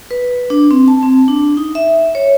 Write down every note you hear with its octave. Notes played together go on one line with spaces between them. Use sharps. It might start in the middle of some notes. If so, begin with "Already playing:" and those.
B4
D4
C4
A5
C4
D4
D#4
E5
C#5